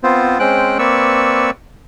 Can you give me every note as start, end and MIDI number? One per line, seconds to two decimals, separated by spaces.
0.04 0.39 59
0.04 0.39 60
0.04 0.39 65
0.04 0.39 72
0.39 0.78 56
0.39 0.78 60
0.39 0.78 61
0.39 0.78 72
0.39 0.78 79
0.39 0.78 90
0.79 1.51 58
0.79 1.51 60
0.79 1.51 71
0.79 1.51 74
0.79 1.51 85
0.79 1.51 88